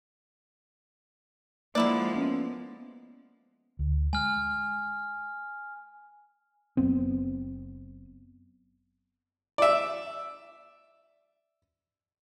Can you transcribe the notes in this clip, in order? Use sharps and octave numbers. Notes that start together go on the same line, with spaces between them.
D3 F3 G#3 A#3 E4 D5 F#6
B3 C#4
D2
G#3 G#5 F6
F#1 F#2 B3 C4
D5 E5